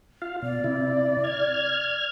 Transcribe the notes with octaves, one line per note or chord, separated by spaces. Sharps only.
F4 F5
B2 D5
C3 E4
F6 G#6